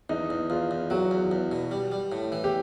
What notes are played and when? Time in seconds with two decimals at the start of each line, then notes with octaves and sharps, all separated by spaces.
0.09 E2 D#4
0.30 E2
0.50 E2 F4
0.71 E2
0.90 F#3 F#4
1.11 E2
1.32 E2
1.52 B2
1.71 G3
1.92 G3
2.12 A2
2.32 E3
2.44 G4